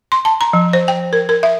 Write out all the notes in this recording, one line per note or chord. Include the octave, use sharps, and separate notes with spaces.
C6
A5
A#5
F3
C5
G5
A#4
A#4
E5